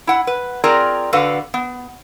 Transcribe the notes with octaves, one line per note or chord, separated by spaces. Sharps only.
E4 F#5
B4
C4 F4 G#4 A#4 D5 A#5
D3 F#4 A4 B4 F5 F#5
B3